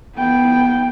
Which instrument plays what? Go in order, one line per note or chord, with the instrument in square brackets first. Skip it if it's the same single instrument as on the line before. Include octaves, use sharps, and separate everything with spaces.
[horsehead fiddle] B3 G5